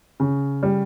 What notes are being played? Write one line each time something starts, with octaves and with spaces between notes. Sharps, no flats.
C#3
G3